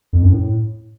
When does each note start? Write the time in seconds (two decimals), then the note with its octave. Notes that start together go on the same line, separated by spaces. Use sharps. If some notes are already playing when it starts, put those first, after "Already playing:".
0.13 F2
0.23 F#2
0.32 A2